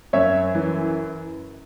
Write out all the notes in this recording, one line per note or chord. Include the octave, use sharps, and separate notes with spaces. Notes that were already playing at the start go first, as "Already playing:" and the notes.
F#2 C#5 E5
E3